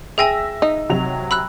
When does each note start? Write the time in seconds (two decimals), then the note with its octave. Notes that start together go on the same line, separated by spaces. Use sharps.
0.18 G#4 E5 G5 G#5 E6 A#6
0.62 D#4
0.89 C3 F#3 F7
1.31 B5 E6 F#6